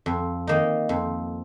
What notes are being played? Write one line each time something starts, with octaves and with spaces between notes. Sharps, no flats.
F2
D#3 A#3 D#4
F2